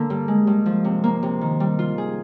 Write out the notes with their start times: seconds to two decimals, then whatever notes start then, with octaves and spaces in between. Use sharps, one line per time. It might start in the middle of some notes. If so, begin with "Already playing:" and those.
Already playing: D3 A#3
0.10 G2
0.28 G#3
0.47 G2
0.66 F3
0.84 C3
1.04 A#3
1.23 C3
1.41 D#3
1.60 G3
1.79 F4
1.98 G#4